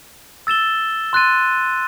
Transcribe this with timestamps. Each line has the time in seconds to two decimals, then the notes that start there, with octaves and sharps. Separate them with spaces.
0.47 E6 A6 E7 G7
1.13 C6 F#6 A6 D#7